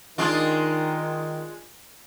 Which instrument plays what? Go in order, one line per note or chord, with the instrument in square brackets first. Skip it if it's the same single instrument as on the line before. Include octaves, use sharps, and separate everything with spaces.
[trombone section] D#3 [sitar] G#3 D4 F4